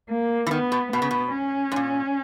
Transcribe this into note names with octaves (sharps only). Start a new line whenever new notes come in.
A#3
E3
D#3 B3
B2
B2 B3
C#3
B2
C#4
G#2
A#2